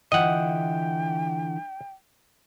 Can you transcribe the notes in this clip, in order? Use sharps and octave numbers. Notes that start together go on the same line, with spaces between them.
D3 E3 F4 D#5 F#5 G5